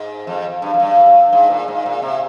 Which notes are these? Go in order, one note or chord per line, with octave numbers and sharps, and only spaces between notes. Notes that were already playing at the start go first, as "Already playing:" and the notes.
Already playing: G#2
F2
G2
F2
G2
G2
G#2
A#2
G#2
A#2
C3